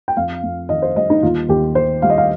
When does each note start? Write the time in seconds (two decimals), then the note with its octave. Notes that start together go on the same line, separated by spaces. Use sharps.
0.08 G5
0.17 F2 F5
0.43 F2
0.69 D#3 D#5
0.82 C5
0.96 G3 D#5
1.10 D#4
1.23 D#2 F4
1.49 D#2 G4
1.75 D#3 C5
2.02 G3 F5
2.10 D#5
2.18 F5